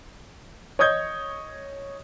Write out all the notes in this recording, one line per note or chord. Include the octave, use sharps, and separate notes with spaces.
C#5 D#5 D#6 G6 G#6